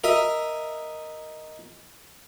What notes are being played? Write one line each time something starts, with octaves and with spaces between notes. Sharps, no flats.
A#4 D#5 E5